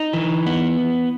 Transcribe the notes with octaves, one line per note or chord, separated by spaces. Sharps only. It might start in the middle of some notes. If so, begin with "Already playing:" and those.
Already playing: D#4
E3
B3